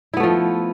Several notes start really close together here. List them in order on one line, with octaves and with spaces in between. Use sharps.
E4 B3 A3 F3